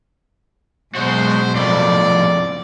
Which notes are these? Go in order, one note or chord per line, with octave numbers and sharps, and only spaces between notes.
B2 F#3 G#3 F#4 C5
F2 A2 D5